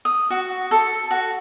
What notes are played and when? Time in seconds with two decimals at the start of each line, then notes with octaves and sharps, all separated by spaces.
0.05 D#6
0.30 F#4
0.71 A4
1.11 F#4